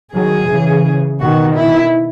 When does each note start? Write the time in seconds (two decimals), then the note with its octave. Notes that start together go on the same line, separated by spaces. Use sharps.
0.14 D#3 F#3 G#4
0.49 C#3 E3
1.20 B2 D#3 F#4
1.55 E4